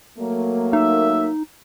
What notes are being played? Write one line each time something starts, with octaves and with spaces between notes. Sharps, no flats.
F#3 A3 A#3
D#4 E5